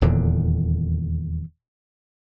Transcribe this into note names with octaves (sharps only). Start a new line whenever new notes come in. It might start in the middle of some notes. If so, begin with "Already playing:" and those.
D#1 E2 A#2 D3